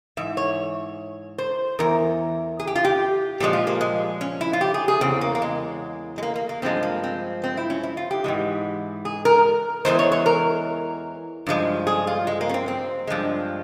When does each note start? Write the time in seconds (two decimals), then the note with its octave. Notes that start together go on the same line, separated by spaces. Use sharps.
0.17 G#2 E3 E5
0.37 C#5
1.38 C5
1.79 E2 E3 A#4
2.60 G#4
2.67 G4
2.75 F4
2.85 G4
3.40 A#2 F3 G#3 G4
3.53 F4
3.67 A#3
3.81 G#3
4.21 C#4
4.41 E4
4.53 F4
4.61 G4
4.74 G#4
4.88 G#4
5.01 E2 C#3 C4
5.21 A#3
5.35 A#3
5.42 G#3
6.18 G#3
6.23 A#3
6.36 A#3
6.49 A#3
6.62 G2 F3 G#3 C4
6.83 A#3
7.03 C4
7.44 C4
7.57 E4
7.70 C#4
7.83 E4
7.97 F4
8.11 G4
8.24 G#2 E3 G#3
9.05 G#4
9.25 A#4
9.85 E2 C#3 E3 G#3 C5
9.99 C#5
10.12 C#5
10.26 A#4
11.47 G2 F3 G#3
11.87 G#4
12.07 F4
12.27 G#3
12.41 A#3
12.49 C#4
12.54 C4
12.68 C4
13.07 G2 F3 G#3